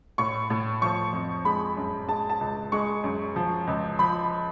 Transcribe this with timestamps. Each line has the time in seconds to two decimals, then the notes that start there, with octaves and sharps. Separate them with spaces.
0.18 A2 C#6
0.50 A2
0.82 F3 C#6
1.13 F2
1.45 G#3 B5
1.77 F#2
2.08 G#3 A5
2.30 A5
2.41 C#2
2.72 G#3 C#6
3.04 F#2
3.36 F3
3.67 C#2
3.99 F3 B5